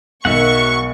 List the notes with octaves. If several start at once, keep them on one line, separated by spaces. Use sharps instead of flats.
B1 G#2 D#3 F#3 D#5 E5 F#5 C#6